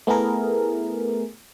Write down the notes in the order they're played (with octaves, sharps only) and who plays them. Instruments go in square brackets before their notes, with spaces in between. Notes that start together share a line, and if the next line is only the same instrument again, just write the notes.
[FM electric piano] A3 B3 E4 G#4 A#4